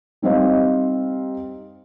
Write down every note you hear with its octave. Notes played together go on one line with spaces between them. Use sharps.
G3 C4 D#4 C5 D#5 F5